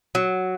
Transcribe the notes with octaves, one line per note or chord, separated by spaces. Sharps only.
F#3